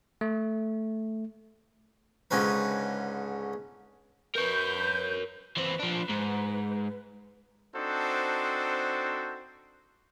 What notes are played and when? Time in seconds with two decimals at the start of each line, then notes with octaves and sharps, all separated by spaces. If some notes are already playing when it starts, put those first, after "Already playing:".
0.21 A3
2.31 C#2 G#2 D3 C#4 B4
4.36 A#4 B4 C#5 G6
5.57 E3 C4 B4
5.79 F3 D4
6.09 G#2
7.76 C4 D4 D#4 F#4 A4 C5